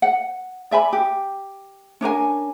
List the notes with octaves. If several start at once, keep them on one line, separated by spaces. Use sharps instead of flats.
F#5
D5 E5 G#5 B5
G4
C#4 D4 A#4 G#5